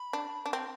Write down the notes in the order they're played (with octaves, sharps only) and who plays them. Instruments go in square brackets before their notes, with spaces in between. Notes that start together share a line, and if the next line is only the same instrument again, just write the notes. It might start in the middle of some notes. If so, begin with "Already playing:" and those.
Already playing: [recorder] B5
[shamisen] D4
D4
C4